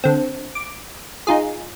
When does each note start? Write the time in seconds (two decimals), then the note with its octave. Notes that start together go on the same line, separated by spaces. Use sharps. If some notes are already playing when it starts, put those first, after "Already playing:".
0.04 D3 C4
0.55 D6
1.27 D#4 F4 G#4